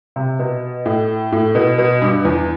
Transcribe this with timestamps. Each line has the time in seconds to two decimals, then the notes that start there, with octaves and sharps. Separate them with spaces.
0.16 C3
0.39 B2
0.86 A2
1.32 A2
1.55 B2
1.78 B2
2.02 G2
2.25 E2